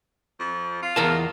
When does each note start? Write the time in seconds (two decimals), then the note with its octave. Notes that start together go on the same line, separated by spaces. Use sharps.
0.40 F2
0.82 F4
0.96 E2 A#4 A5